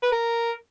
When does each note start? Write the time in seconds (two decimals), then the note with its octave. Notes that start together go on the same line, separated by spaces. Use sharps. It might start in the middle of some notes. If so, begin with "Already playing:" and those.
0.03 B4
0.12 A#4